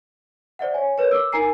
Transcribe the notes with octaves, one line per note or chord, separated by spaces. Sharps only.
C5 D5 E5 F#5
C#5 G#5
A#4 B4 C#5
D6 E6
D#4 A#4 G#5 A#5 C7